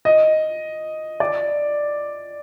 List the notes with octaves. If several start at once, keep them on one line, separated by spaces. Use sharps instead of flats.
D#5
D5